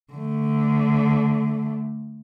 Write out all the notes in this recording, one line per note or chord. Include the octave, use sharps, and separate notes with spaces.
D3 A3